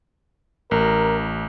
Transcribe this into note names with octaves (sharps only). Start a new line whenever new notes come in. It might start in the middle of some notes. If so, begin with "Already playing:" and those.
A1 A#4